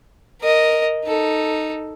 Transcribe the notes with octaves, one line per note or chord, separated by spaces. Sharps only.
A#4 D#5
D#4 A4